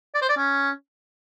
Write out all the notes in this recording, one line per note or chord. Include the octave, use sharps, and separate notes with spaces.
D5
C5
D5
C#4